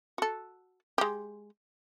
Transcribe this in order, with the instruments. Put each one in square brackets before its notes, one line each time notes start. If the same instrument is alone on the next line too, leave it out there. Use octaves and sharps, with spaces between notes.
[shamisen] F#4 A4
G#3 G4